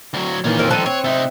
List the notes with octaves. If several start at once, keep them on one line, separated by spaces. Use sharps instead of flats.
D2 F#3
A#2 D#3 E3 C#4 F4
F2 C4 A#4
G2 D#3 F3 A4 F#6 D#7
C4 C#5
C3 D#4 E5